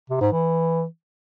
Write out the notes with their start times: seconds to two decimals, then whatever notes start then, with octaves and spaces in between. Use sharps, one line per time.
0.10 C3
0.21 G#2
0.32 E3